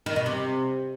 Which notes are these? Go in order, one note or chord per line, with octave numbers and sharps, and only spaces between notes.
D#3
B2
C3